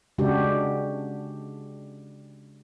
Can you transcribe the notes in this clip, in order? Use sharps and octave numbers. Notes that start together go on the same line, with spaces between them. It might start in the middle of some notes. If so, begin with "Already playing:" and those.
C#3 G#3 D4 F#4 G4